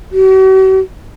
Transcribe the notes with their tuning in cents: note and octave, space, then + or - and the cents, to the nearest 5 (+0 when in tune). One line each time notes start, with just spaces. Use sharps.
F#4 +45